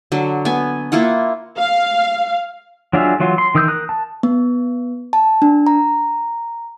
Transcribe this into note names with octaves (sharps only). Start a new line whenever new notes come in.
D3 F#3
B3 G#5
A#3 E4 F4 F#5
F5
F#3 D4 F4 G#4 E5
E3 F#3 F4
C6
D#3 E3 D#6 E6 G6
A#4 D#6 F#6
A5
B3
A5
D4
A#5